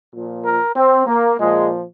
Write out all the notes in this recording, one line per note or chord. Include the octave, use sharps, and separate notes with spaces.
A#2 F3
A#4
C4
A#3
A#2 F3 G#3